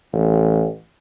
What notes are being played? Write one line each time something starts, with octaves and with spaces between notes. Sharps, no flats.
A1